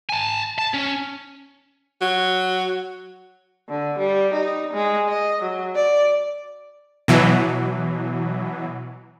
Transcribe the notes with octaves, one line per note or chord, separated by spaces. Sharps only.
G#5 A5
A5
C#4
F#3
D3
G3
D#4
G#3
D#5
F#3
D5
B2 E3 F#3